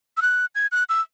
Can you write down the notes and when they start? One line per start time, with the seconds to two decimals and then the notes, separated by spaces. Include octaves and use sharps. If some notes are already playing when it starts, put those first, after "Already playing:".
0.17 E6
0.22 F#6
0.55 G#6
0.72 F#6
0.89 E6